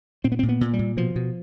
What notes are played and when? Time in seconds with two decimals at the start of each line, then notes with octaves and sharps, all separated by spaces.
0.24 A#2 C4
0.32 B3
0.39 C4
0.43 A#2
0.49 B3
0.61 A#2
0.73 G3
0.79 A#2
0.97 B2 F3
1.16 B2